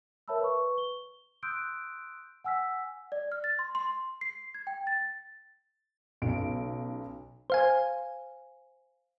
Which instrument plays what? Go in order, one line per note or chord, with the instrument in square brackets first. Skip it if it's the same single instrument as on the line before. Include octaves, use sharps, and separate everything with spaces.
[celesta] A#4 C#5 E5 A5 B5 E6
B4 C#6
G7
C6 D#6 E6 F#6 G6 D7
F#5 G#5 E6 F6 B6
D5
F6
A6
C6
C6
C7
G#6
G5
A6
[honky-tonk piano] B1 C#3 D7
[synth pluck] C5 F5 G#5